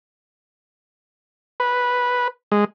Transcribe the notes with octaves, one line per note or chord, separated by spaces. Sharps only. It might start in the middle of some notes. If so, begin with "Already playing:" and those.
B4
G#3